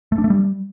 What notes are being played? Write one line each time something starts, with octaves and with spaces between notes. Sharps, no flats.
A3
D4
A3
G3